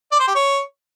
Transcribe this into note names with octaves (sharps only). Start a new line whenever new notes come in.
D5
C5
G4
C#5